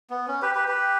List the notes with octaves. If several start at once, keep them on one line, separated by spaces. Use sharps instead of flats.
B3
C#4
G4 B4
G4 B4
G4 B4